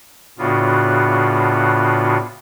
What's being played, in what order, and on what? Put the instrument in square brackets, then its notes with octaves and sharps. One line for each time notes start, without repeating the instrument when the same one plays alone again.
[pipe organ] A2 C#3 B3 D4 F4 F#4